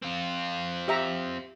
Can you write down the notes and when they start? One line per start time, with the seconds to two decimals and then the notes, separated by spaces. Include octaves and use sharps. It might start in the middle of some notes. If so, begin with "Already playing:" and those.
0.02 C4 F4
0.88 G4 E5 A#5